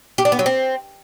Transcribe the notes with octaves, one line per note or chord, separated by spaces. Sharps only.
G4
D4
B3
F#3
C4